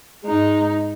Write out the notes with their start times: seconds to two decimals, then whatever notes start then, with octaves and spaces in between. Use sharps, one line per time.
0.24 G#2 G#3 D#4